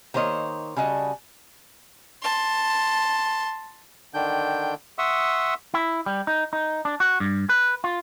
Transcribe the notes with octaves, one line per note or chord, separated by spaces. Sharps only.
D#3 A#3 C5 C#5 D#5
C#3 G3 F#4 D#5 A5
A5 C6
D3 D#3 D4 G5 G6
E5 F#5 C6 C#6 D#6 E6
E4
G3
D#4
D#4
D4
F#4
G2
B4
F4